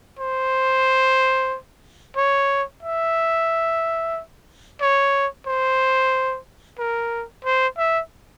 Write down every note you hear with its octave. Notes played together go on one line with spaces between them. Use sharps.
C5
C#5
E5
C#5
C5
A#4
C5
E5